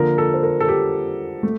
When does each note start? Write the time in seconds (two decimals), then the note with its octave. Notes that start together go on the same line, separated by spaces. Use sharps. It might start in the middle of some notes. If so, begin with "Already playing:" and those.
Already playing: D3 F3 A#3 A#4
0.18 A4
0.34 C5
0.43 A#4
0.60 A4
0.68 G4
1.43 A3